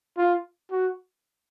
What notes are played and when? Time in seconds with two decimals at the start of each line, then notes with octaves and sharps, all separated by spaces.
0.18 F4
0.71 F#4